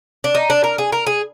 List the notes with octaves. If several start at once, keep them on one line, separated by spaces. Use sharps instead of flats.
D4
D#4
D4
A#4
G#4
A#4
G#4